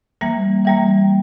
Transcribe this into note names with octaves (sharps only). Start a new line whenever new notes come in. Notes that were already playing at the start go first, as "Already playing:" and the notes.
E3 G3 A#3
E3 G3 A#3